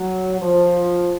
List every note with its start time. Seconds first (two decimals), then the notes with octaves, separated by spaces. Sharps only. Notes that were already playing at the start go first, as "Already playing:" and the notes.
Already playing: F#3
0.41 F3